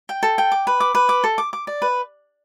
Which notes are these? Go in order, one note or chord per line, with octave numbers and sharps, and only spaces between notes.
G5
A4
G5
D6
B4
D6
B4
D6
A4
D6
D6
D5
B4